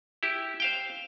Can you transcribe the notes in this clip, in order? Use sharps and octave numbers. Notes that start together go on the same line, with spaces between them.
E4 G4
C5 F5 G5